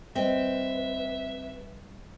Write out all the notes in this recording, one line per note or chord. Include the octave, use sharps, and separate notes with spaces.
G3 C4 B4 D#5 E5